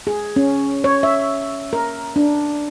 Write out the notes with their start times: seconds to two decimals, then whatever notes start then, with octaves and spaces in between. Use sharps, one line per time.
0.07 G#4
0.36 C#4
0.84 C#5
1.03 E5
1.73 A#4
2.16 D4